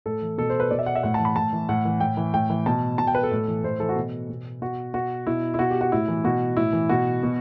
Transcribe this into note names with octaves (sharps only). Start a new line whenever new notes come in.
A2 A4
E3
B2 A4
C5
B4
B2 D5
E5
F#5
E5
A2 F#5
E3 A5
B5
A2 A5
E3
A2 F#5
E3
A2 G5
E3
A2 G5
E3
B2 A5
B2 A5
G5
B4
A4
A2
E3
A2 C5
E3 A4
F#4
B2
B2
B2 F#4
B2 F#4
B2 E4
E4
B2 F#4
G4
F#4
A2 E4
E3
B2 F#4
A2 E4
E3
B2 F#4
B2